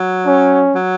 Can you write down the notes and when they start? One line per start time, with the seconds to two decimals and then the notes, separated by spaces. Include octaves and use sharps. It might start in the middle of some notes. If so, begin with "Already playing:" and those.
Already playing: F#3
0.26 C#4
0.75 F#3